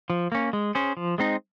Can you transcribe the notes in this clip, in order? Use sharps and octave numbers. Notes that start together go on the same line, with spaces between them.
F3
A#3 C#4
G#3
C#4 G#4 C5
F3
G#3 C4 D#4